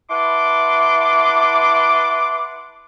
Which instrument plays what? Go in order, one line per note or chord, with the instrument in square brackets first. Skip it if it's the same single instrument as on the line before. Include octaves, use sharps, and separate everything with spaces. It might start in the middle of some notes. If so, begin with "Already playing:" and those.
[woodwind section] E4 B4 F#5 A5 C6 D6